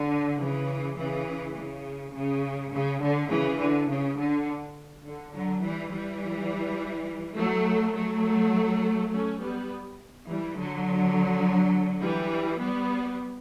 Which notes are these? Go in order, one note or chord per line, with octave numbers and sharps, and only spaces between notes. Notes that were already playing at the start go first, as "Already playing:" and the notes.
Already playing: D3
C#3 E3
C#3 E3
C#3
C#3
C#3
D3
C#3 E3
D3
C#3
D3
D3
D3 F#3
E3 G3
E3 G3
F#3 A3
F#3 A3
A3 C#4
G3 B3
E3 G3
D3 F#3
E3 G3
G3 B3